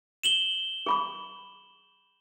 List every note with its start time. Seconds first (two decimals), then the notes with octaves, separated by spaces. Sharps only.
0.23 E7 F#7 G7
0.86 G#4 B5 D6